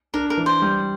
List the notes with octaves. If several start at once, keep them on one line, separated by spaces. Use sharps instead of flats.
D4 A#4
A#4
E3
C5
G3